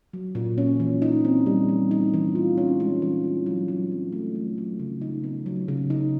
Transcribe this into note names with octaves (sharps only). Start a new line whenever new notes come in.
F#3
A#2
C#4
E3
D#4
C4
G3
E3
D#4
E3
F4
C#4
G#3
E3
F4
F#3
F#3
C4
A3
F#3
F#3
C#3
D#4
B3
F#3
C#3
D#4